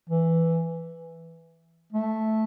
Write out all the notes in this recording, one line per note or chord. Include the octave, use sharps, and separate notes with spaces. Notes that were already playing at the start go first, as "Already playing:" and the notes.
E3
A3